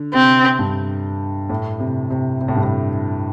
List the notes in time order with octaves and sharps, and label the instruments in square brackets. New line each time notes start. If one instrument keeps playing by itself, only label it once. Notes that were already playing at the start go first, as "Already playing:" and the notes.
Already playing: [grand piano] D3
[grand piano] C3 [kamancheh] C4
[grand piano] G2
A2
C3
C3
C3
A2
G2
A2